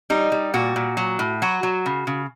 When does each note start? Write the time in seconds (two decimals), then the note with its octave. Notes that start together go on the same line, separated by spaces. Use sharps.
0.10 G3 D#4
0.32 G3
0.54 A#2 F#4
0.76 A#2
0.97 F#3
1.19 A2
1.42 F#3 F#4
1.63 F#3
1.86 C#3
2.07 C#3